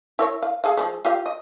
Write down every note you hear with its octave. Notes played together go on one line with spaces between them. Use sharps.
E4 A#4 C#5
F5
G#4 A4 F5
F3 G#3 A3
F4 G4 F5
D#5